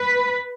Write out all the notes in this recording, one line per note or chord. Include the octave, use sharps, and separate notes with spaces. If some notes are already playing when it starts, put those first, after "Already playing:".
Already playing: B4